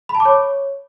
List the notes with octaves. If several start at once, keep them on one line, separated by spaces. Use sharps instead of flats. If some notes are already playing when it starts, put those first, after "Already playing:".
B5
A5
D6
C#5